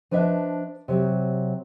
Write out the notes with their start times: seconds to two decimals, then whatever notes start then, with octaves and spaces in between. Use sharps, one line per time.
0.11 F3 D4 B4 D#5 E5
0.88 C3 F#3